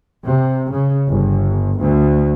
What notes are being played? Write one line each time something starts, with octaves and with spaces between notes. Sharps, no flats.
C3
C#3
G1
D2